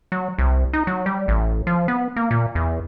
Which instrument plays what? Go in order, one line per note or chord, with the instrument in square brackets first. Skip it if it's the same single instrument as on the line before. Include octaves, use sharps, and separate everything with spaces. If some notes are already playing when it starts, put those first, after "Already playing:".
[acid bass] F#3
C2
D#4
F#3
G3
A1
F3
B3
A#3
A#2
E2